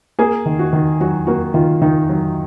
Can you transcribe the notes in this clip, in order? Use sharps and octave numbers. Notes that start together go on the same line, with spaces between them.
A#3 G#4
D#3
F#4
D#3
F#3 F#4
A#3 F#4
D#3 F4
D#3 D#4
F#3